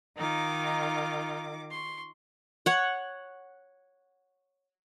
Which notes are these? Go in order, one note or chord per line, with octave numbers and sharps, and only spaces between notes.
D#3 D#4 F4 D6
C6 C#6
C#5 F#5